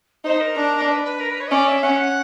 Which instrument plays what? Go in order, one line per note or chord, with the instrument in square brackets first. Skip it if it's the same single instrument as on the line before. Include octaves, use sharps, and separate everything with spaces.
[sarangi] D#4 [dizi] C5
[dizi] A#4
[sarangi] D4
[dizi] B4
B4
A#4
B4
C#5
D#5
[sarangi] C#4 [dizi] D5
[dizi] E5
[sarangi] C#4 [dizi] F#5
[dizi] F#5